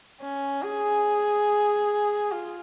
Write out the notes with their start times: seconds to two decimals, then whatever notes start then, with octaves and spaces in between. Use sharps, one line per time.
0.21 C#4
0.63 G#4
2.32 F4